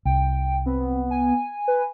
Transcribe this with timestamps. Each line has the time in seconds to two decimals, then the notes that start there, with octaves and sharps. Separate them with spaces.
0.05 C2 G5
0.66 B3 C4
1.11 G#5
1.68 B4